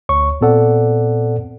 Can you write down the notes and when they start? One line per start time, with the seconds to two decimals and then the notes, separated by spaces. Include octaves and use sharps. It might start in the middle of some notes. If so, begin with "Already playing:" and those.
0.09 D2 C#5 C#6
0.41 A#2 B3 C4 A4 D5 F#5